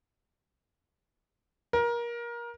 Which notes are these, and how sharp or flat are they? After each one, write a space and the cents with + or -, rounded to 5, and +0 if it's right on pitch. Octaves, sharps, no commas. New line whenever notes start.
A#4 +25